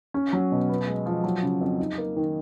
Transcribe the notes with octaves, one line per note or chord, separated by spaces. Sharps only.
C#4
F#3
B2
B3
G#3
F3
F#3
C#3
F2
D#4
A#3
D#3